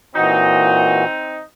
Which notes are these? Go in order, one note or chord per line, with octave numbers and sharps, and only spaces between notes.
A#2 E3 C4 D#4 F#4